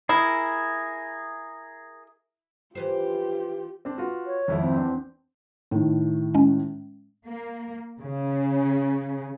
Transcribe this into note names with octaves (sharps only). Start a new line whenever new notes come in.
E4 G#4 A#4
E3 F4 G4 B4 C5
C4 D4
F4 F#4 B4
C#5
G#1 F2 E4
C4
E2 D4
A2 D#3
G#3 C#4
A#3
C#3